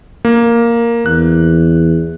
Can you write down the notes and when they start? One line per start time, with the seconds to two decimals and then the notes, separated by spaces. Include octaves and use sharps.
0.25 A#3
1.06 E2 F#6